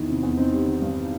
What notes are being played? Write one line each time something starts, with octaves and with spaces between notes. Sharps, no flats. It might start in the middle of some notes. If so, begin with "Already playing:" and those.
Already playing: E2 D#3 E4
C3
E2
C4 D#4
G3
D#3
G2